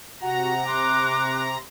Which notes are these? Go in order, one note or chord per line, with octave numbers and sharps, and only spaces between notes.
C3 F#4 F#5 A#5
C6 D6 F#6